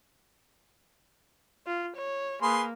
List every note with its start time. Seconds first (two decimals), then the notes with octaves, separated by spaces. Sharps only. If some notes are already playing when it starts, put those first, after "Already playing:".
1.66 F4
1.96 C#5
2.42 A#3 G#4 B4 C6